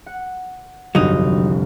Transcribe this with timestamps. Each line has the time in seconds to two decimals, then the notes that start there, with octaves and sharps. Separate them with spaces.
0.06 F#5
0.95 G1 C2 F2 F#3 D#4